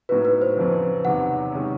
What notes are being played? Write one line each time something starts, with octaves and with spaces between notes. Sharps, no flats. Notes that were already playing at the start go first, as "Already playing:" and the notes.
A2 F#3 B3 D#4 F#4 B4
B4
C5
F2 C#3 F#3
E2 C3 D#3 F#3 B3 F#5
C3 D#3 G#3 C#4